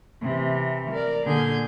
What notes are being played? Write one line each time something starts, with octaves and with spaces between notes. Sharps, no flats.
C3 E3
A#4 D5
A#2 D3 G#4 G#5 G6